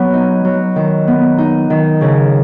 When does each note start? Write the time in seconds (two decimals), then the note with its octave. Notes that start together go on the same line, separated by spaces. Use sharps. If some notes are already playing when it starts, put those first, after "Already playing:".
Already playing: F#3 B3
0.13 D#4
0.45 F#3
0.76 D#3
1.08 B3
1.38 D#4
1.70 D#3
2.01 C#3